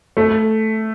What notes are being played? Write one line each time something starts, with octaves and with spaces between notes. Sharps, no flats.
A3